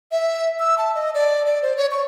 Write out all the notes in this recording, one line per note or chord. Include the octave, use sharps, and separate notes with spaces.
E5
E6
A5
D#5
D5
D5
C5
C#5
C#6